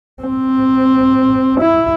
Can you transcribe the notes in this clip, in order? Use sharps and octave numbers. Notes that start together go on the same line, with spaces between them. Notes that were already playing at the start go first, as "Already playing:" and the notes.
C4
E4